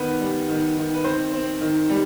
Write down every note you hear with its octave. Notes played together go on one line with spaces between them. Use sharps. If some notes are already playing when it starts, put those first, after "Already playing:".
Already playing: D#3 B3 B4
G3
D#3
D#3
B4
D#3 C4 C5
C4
D#3
G3